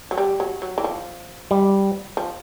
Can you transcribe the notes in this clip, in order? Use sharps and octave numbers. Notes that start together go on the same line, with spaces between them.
F#3
G3
F#3
F#3
E3
F3
G3
F3